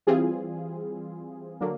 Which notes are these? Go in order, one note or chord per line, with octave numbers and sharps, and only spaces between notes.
E3 G3 C4 F4 G#4
D3 F#3 A#3 D4